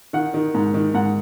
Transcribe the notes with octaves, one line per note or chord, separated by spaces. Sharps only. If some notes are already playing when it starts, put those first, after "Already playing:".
D#3 F#5
D#3
G#2
D#3
G#2 F#5